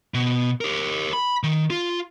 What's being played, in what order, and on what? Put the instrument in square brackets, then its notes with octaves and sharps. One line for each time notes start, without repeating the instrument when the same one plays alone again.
[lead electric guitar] B2
G4 A#4
B5
D#3
F4